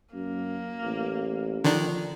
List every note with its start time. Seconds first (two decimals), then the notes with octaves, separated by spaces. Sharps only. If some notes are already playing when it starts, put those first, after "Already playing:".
0.14 F#2 A#3
0.84 A1
1.64 D3 D#3 F3 D4